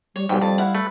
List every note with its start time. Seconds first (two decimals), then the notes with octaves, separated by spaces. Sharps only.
0.16 G3 C#5
0.29 B1 G#2 G3 G5
0.41 F2 A5
0.58 E4 F5 F#5
0.75 A3 B4